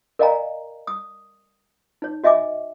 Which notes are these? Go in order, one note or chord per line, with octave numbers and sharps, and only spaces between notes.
A#4 D5 D#5 F5 G#5 A#5
D#6
D#4 C#5
F#4 D#5 E5 G#5 D6